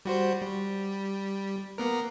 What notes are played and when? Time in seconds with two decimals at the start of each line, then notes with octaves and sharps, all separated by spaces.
0.05 G3 F#4 C5
0.41 G3
1.78 A#3 B3 A#4